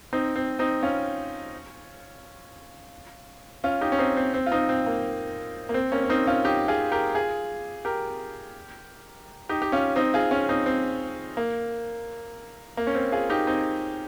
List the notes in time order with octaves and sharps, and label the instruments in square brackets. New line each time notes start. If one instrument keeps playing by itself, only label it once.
[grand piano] C4 D#4
C4
C4 D#4
C#4 F4
C#4 F4
D#4 G4
C#4
C4 D#4
C4
C4
F4
C4 D#4
C4
A#3
A#3
C4
A#3 C#4
C#4
C4 D#4
C#4 F4
D#4 G4
F4 G#4
G4 A#4
F4 G#4
G4 A#4
D#4 G4
G4
C#4 F4
C4 D#4
F4 G#4
C#4 F4
C4 D#4
C4
A#3
A#3
C#4
C4
F4 G#4
D#4 G4
C4 D#4